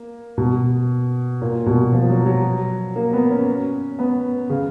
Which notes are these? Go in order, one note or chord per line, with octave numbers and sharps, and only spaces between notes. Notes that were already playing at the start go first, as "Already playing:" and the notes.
Already playing: A#3
B2
A#2
B2
F3
F#3
F#3
A#3
B3
C#4
B3
C#3